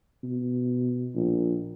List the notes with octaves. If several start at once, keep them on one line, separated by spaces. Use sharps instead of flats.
B2
A#1